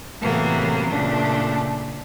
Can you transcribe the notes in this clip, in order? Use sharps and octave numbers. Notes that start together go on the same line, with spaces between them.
A2 C3 E3 F#3 A#3 B3
A#2 C#3 A3 D4